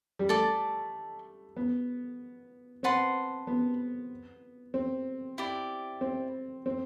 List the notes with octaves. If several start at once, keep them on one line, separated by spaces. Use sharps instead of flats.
G3
A3 A4 D5 A5
B3
C4 B4 F#5 A5 C6
B3
C4
E4 G4 D5
C4
C4